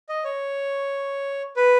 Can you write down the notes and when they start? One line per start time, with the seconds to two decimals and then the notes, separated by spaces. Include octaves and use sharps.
0.09 D#5
0.24 C#5
1.57 B4